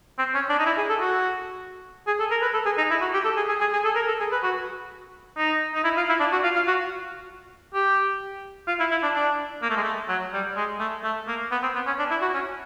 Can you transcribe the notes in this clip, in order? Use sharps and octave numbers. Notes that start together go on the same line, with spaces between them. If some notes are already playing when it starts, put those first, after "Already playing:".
C4
C#4
D4
D#4
E4
G#4
A4
F#4
G#4
A4
A#4
B4
A4
G#4
D#4
E4
F#4
G4
A4
G#4
G#4
G#4
G#4
A4
A#4
A4
G#4
B4
F#4
D#4
D#4
E4
F4
E4
D4
F#4
F4
F4
F#4
G4
F4
E4
E4
D4
D4
A#3
A3
G#3
A3
F#3
G3
G#3
A3
A3
A#3
B3
C4
B3
C#4
D4
E4
F#4
C#4